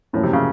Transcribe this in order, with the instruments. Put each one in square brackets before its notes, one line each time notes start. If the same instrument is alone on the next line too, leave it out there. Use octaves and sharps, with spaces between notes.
[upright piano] F#2 F3 A#3 C#4 [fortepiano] A2
[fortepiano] C3
C#3